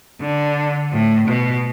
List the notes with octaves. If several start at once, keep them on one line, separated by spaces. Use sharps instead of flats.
D3
A2
B2